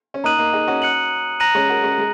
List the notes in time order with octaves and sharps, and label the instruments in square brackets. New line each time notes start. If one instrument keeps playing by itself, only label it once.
[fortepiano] C#4
[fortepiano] A#3 D#4 [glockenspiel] A#5 D#6 F#6 D#7 F#7
[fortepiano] A#3 D#4
D#4 G#4
C#4 F#4
[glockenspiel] F#6 C#7 F#7
A#5 F#6 A#6 D#7 F#7
[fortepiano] G#3 C#4
F#4 A#4
G#3 C#4
G#3